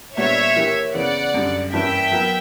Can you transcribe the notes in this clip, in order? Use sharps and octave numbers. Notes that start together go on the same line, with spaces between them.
A#2 G3 B3 D4 C#5 E5
E3 A#3 E4 G4
C#3 E3 B3 D5 F#5
F#2 D3 G3
G2 E3 A#3 C#4 E4 E5 G5
F#3 B3 E4 A#4